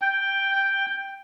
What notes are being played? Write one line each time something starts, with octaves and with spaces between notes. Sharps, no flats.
G5